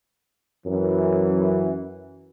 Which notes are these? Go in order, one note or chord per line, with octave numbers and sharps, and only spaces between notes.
F#2 E3